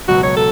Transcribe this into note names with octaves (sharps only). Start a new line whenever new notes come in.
C#2 B2 F#3 F#4
C#5
A4